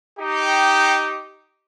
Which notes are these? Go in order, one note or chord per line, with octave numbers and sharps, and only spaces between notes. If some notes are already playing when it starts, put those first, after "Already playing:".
D#4 G4